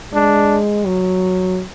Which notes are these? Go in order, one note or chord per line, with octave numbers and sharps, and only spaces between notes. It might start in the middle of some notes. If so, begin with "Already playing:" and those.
G#3 D4
F#3